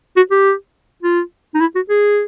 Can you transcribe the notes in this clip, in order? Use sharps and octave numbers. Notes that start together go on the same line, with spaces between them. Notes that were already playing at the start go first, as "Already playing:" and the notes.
F#4
G4
F4
D#4
E4
F#4
G#4